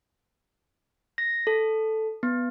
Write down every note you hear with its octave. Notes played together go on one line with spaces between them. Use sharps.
A#6
A4
B3